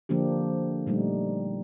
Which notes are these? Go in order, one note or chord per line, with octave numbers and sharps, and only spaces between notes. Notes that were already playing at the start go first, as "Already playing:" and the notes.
D3 F3 A#3 D4 G4
A#2 G3 A3 D#4